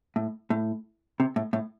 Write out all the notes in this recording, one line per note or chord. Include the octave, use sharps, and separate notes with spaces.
A2
A2
C3
A2
A2